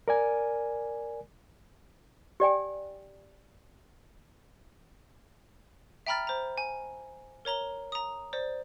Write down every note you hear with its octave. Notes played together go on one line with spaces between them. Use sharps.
A#4 D5 G#5
G4 D5 G5 G#5
E5 G5 A#5 B5 F6 A6
C5 A#5
G#5
A#4 C#5 A#5 G7
A#5 D#6
C5 D5